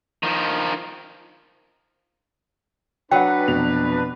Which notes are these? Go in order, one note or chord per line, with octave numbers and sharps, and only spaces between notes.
D#3 F3
F#3 D4 B4 F#5 G5
F1 B2 F7